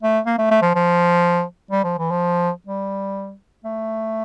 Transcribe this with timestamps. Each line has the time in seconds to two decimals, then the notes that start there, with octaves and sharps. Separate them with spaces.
0.03 A3
0.26 A#3
0.38 A3
0.51 A3
0.62 F3
0.75 F3
1.71 G3
1.84 F3
1.99 E3
2.11 F3
2.67 G3
3.64 A3